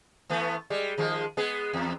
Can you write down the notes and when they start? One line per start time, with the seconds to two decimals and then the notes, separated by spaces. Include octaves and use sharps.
0.30 E3 A3 B3
0.70 G3 G#3
0.98 D#3 F3 G#3
1.37 G#3 B3 G#4
1.73 E2